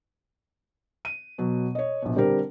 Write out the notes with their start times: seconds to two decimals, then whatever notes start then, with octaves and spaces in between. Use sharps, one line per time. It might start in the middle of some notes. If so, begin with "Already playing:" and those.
1.05 D#7
1.38 B2 F#3
1.75 C#5 D#5
2.02 A#1 B2
2.16 D3 G3 C4 G4 A#4